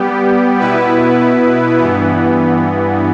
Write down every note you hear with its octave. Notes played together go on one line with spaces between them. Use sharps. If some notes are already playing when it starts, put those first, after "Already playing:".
Already playing: G3 B3 G4
B2 B3 E4 B4
G2 E3 B3